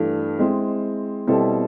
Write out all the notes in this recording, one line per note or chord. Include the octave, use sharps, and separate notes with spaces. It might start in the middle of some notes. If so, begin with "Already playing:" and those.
Already playing: G2 E3 A3
G#3 C4 E4
B2 G3 C4 E4 A4